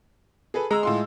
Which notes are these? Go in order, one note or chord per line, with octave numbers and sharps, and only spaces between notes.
G#4 A4 B4
G#3 A#5 E6
A2 F4 C6